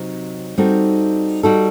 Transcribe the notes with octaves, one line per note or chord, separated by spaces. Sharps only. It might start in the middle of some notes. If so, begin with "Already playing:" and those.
Already playing: C3 F#3 C4 D#4
G3 C4 D#4 F#4 A4
G3 D#4 F#4 A4